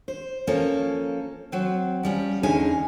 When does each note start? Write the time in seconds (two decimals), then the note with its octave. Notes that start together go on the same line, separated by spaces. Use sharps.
0.08 C5
0.47 F3 A#3 C#4 A4
1.52 F#3 C4
2.03 F3 G3 C#4
2.43 E2 D3 C#4 D#4 G#4 G#5